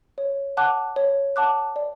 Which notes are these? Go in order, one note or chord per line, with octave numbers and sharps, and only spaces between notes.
C#5
F#5 A5 D6 F#6
C#5
F#5 A5 D6 F#6
D5